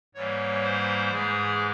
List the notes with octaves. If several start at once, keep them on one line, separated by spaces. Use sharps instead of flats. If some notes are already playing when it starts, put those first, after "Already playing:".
G#2 E3 G3 A#3 C#5
C5
G#2 E3 G#3 G#4